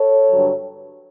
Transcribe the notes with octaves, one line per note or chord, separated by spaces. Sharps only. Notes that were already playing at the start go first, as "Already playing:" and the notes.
Already playing: A4 C#5
G2 D3 F#3